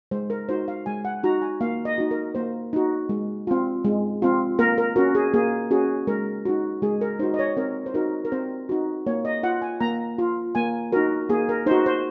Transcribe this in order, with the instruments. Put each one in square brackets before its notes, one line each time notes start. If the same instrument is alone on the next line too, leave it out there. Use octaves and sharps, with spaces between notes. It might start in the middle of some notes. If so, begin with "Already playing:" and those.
[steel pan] G#3 C5
A#4
D#4 F#4 C5
F5
G#3 G#5
F#5
D#4 F#4 A#5
G#5
A#3 F5
D#5
D#4 F#4
A#4
A#3 C5
D#4 F#4
G#3
C4 F4
G#3
C4 F4
A#3 A#4
A#4
C#4 F#4 A#4
G#4
A#3 G#4
C#4 F#4 G#4
G#3 A#4
D#4 F#4
G#3 G#4
A#4
D#4 C5
F#4
D#5
C#5
C4 A#4
C5
D#4 F#4 A#4
A#4
C4 C5
D#4 F#4
A#3 C#5
D#5
F4 F#5
G#5
A#3 A#5
F4
A#3 G#5
D#4 F#4 A#4
A#3 G#4
A#4
D#4 C5
F#4
C5